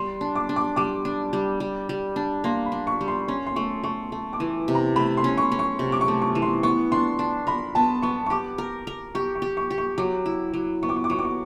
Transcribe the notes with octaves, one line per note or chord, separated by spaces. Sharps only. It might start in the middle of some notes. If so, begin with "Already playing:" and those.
Already playing: G3 C6
D4
D6
D4
D6
G3 D6
D4
G3
G3
G3
D4
A#3 C6
B5
D4
C#6
G3
C6
C#4 C6
C6
A3 C#6
A3 C#6
A3
D6
E3
C3
A#5
A3 B5
C6
C#4
C#6
C#4
C#6
C3
D6
C#6
A3
C#6
E3
C6
B3 C#6
D4 C6
D4
A#4 B5
B3 A5
B3 C#6
C#6
G4 D6
A#4
A#4
G4 C#6
C#6
G4
C#6
G4
C#6
F#3 D6
E4
F#3
B3 C#6
D6
C#6
D6
F#3 C#6
D6
C#6